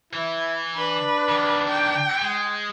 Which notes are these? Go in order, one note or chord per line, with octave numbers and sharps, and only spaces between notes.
E3 E4
D4 B4
D#3 E3
G5
G#3